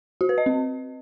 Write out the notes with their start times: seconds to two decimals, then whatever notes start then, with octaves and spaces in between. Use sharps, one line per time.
0.21 F#4
0.29 B4
0.38 D#5
0.46 C4